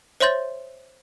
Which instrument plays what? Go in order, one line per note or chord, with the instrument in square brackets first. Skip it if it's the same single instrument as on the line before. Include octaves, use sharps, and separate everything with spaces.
[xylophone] C5 C#5 E5 C6 G6 A6